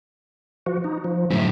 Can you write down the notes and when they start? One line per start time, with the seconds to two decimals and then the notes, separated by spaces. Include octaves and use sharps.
0.66 F3 F#4
0.84 D#4
1.04 F3
1.30 F#2 A2 E5